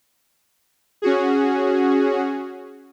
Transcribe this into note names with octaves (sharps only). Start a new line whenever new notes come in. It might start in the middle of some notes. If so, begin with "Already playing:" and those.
C#4 F#4 G#4